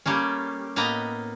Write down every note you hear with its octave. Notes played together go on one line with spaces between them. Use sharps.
G3 A3 A#3 C#4
A2 A#3 B3 D#5 A#5